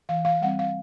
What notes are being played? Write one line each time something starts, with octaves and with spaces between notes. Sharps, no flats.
E3 F5
F5
G3 C4 F#5
F5